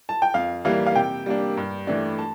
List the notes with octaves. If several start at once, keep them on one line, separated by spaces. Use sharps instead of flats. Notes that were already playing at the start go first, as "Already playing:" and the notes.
A5
G5
F2 F5
E3 G3 A#3 F5
F5
C3 G5
G3 A#3 D4
G2
E3 A3 D4
A5